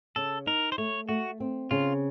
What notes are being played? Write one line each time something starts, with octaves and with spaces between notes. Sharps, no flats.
C#3 A4
D#4 A#4
C5
A3 C#5
A3 F#4
C4
C#3 F4